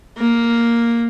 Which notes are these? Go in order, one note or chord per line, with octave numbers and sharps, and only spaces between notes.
A#3